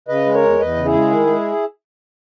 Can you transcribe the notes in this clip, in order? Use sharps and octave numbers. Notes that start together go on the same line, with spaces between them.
C#3 B4 D#5
G#3
A#4 C#5
E2
E2 B4 D#5
C#3
E4 G#4
G#3
D#3
G#3